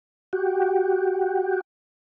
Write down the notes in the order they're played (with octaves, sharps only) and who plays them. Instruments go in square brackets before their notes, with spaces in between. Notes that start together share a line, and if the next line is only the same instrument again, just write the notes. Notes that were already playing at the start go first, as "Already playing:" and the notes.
[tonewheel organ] F#4 G4